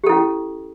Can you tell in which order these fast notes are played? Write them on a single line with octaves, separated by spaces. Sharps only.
G4 A4 E4 C#4